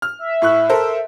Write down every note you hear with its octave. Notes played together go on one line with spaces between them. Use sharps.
F6
E5
A2 C#6 F#6
A4 A#4 C5